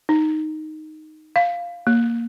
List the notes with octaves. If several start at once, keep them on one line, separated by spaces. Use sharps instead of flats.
D#4
F5
A#3